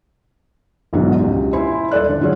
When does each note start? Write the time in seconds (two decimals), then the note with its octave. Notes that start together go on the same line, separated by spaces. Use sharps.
0.93 A#1 E2 G#2 B2 D3 F#3
1.19 C#2 G4
1.53 E4 C5 E5 G#5 C6
1.91 D#1 A4 D5 F#6
2.09 D3
2.21 D3 F#3 G#3 F4 G#4 C#5